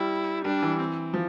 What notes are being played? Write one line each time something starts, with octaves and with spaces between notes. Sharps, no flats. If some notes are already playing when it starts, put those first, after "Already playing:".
Already playing: G3 E4
G3 D4
E3
C4
F3